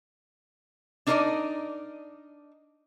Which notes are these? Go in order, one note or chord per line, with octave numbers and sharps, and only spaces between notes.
D4 D#4 A#4 C5 D5 D#5